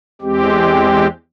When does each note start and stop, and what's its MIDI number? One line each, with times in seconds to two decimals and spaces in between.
0.21 1.07 40
0.21 1.07 56
0.21 1.07 60
0.21 1.07 67